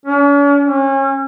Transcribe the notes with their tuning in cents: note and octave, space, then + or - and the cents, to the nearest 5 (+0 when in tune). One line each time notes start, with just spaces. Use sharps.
C#4 +45
C#4 -30